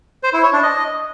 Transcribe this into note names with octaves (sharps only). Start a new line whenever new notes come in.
C5
E4
C#5
D4
D#5